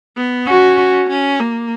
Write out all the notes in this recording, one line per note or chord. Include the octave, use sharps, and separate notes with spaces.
B3
C#4 F#4
C#4
A#3